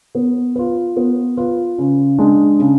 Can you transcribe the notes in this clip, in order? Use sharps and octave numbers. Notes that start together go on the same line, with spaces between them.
B3
F4 B4
B3
F4 B4
C#3
G#3 D4
C#3